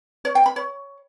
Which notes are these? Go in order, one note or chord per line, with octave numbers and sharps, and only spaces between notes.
C#5
G5
B5
C#5